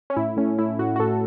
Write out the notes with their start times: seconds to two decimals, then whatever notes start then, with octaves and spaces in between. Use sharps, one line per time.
0.10 C#4
0.16 A2 E4
0.37 A3 C#4
0.58 A3 E4
0.79 A2 F#4
0.96 F#4
1.00 A2 A4